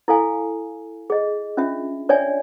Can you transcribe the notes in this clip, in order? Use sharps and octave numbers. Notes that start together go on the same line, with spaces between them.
E4 A4 F5 G#5
G#4 D#5
C#4 D4 F4 E5
D4 C#5 D5 E5 G5 G#5